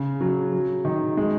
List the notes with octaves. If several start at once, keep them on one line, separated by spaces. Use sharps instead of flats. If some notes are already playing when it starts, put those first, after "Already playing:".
Already playing: C#3
F#3
F#3
D#3
G#3